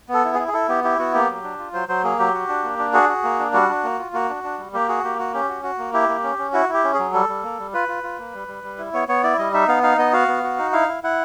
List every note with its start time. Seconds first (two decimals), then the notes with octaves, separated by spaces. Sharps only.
0.09 B3 A4
0.24 E4
0.34 G#4
0.39 E4
0.48 G#4
0.54 E4 A4
0.69 B3 G4
0.84 E4 G4
0.99 B3 F#4
1.14 A#3 G4
1.29 F#3
1.44 D4
1.59 F4
1.73 F#3 C5
1.88 F#3 C5
2.04 A#3 G#4
2.19 F#3 G4
2.34 F#4
2.49 D4
2.64 A#3
2.79 D4
2.94 F#4 G#4
3.09 F#4
3.24 A#3
3.39 D4
3.53 G3 F#4
3.69 D4
3.84 A#3
3.99 F4
4.13 A#3 F#4
4.29 D4
4.44 D4
4.58 G3
4.74 A#3 G4
4.88 F#4 G#4
5.04 A#3 G4
5.18 F#4
5.34 C#4 G4
5.49 F#4
5.63 F#4
5.79 A#3
5.93 E4 G4
6.09 A#3
6.23 C#4
6.38 C#4
6.53 E4 F#4
6.69 E4 G4
6.84 C#4
6.94 G#4
6.99 F#3
7.13 G3 A4
7.29 G3
7.43 A#3
7.59 G3
7.74 F4 B4
7.88 F4
8.03 F4
8.19 A#3
8.34 G3
8.48 G3
8.64 G3
8.78 E4
8.93 B3 C#5
9.08 B3 C#5
9.23 E4 D5
9.39 G3 D#5
9.53 D#4 E5
9.68 B3 F5
9.83 D#4 F5
9.98 B3 D#5
10.13 F#4 F5
10.28 B3
10.43 F#4
10.59 D#4
10.73 E4 F5
10.88 E4
11.03 E4 F#5